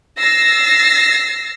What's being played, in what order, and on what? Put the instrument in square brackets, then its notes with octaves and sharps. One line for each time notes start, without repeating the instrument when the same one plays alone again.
[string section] E6 A6 A#6 C7